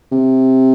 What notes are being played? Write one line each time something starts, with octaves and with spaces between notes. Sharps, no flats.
C3